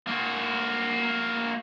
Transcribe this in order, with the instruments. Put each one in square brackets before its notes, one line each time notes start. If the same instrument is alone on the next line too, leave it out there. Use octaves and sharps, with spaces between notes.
[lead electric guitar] A#3 F#4